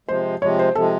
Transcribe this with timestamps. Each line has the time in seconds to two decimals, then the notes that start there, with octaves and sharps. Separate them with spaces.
0.08 C3 F3 G#3 C5
0.42 C3 F3 G#3 C#5
0.59 C5
0.75 C3 F3 G#3 A4